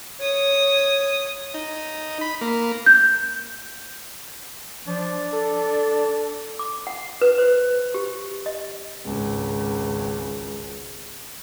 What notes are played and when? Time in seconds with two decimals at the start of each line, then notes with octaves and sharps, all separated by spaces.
0.20 C#5 D#6
1.54 D#4
2.21 B5
2.41 A#3
2.86 G6
4.87 F3 D4
5.33 A4
6.59 D6
6.87 F#5
7.21 B4
7.38 C5
7.94 G4
8.46 D#5
9.06 G#1 C#2